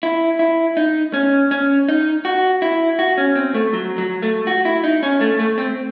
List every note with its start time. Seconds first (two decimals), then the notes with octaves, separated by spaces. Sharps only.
0.03 E4
0.39 E4
0.77 D#4
1.14 C#4
1.51 C#4
1.89 D#4
2.25 F#4
2.62 E4
2.99 F#4
3.18 C#4
3.36 C4
3.54 A3
3.73 F#3
3.98 F#3
4.22 A3
4.47 F#4
4.65 E4
4.84 D#4
5.03 C#4
5.21 A3
5.39 A3
5.58 C4